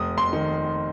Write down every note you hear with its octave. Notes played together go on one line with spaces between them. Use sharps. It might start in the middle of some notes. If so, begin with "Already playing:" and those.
Already playing: F1 D#6
C6
D#3